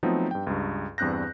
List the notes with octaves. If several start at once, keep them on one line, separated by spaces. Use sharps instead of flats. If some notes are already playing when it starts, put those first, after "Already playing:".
F3 F#3 A3 B3 C4 D#4
G2 G5
C#2 G2
E2 G2 C4 F#6 G6 A#6